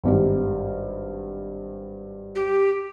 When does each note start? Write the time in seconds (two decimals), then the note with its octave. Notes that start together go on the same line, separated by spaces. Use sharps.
0.04 G#1 G2 G3
2.35 G4